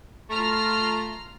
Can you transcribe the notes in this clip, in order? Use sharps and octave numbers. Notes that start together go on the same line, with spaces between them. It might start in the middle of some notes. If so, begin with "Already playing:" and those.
A3 F4 A#5 F6